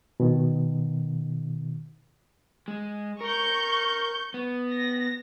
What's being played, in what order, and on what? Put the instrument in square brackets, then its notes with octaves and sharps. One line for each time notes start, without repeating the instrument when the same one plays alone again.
[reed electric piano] B2 D#3
[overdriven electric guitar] G#3
[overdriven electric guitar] A#4 [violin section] C#6 G6
[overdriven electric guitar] B3
[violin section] A#6